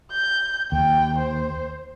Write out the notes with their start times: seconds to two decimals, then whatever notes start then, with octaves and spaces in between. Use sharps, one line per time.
0.12 G6
0.72 D#2 G5
1.18 C5